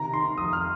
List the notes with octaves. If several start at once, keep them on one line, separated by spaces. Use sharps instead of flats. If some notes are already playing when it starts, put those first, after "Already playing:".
Already playing: C3 D#3 A#5
D#3 C6
F2 D#6
F6